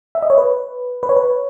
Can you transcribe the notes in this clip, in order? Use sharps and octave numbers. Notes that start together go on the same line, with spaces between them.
E5
D#5
C#5
B4
B4
C#5
B4